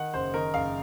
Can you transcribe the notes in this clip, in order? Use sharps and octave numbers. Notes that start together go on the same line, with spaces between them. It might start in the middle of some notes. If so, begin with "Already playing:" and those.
Already playing: D#3 F#5
F#1 C5
D#3 A#4
F#1 F5